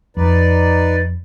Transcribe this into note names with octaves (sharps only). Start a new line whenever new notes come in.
F2 D#4 B4 D5